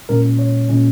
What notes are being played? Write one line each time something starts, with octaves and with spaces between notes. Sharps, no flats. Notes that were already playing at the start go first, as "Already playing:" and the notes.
A#2 G#3 C#4 A#4
C#5
A#2 G#3 C#4